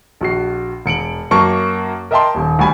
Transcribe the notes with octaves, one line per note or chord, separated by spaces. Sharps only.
A#1 F#4 C7
E1 C#7 D7 F#7
F#2 A#3 A5 C#6
A#4 D#5 E5 G5 A5 C6
D#1 D#2
D2 G3 G#5 B5